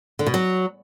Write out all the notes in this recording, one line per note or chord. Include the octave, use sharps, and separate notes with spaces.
D3
B2
F#3